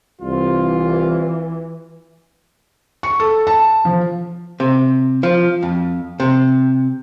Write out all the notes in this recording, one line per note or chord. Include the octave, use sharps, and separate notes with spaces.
C2 E3 F4
C#6
A4
A5
F3
C3
F3
F2
C3